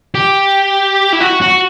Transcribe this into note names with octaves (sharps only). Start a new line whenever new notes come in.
G4
E4
F#4
F#4